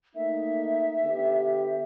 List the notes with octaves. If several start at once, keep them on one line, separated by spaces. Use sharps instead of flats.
A3 A#3 D#4 E5
D3 B3 G4